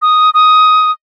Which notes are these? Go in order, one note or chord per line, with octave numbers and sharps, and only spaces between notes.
D#6
D#6